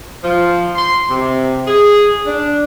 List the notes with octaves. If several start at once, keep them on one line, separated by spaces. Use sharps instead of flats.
F3
C6
C3
G#4
D4